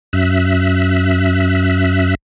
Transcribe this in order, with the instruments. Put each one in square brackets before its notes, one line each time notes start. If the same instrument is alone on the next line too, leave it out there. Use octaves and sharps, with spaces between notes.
[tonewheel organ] F#2 E5 F#6